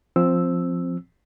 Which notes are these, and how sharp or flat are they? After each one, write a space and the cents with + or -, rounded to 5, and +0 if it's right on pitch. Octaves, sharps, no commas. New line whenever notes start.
F3 +0 C4 +0 E6 +0